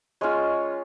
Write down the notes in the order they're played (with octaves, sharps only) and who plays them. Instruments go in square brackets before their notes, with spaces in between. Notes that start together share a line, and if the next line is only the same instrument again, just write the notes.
[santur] G#3 C#4 F4 C#5